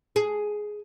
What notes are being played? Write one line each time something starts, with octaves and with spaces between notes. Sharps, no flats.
G#4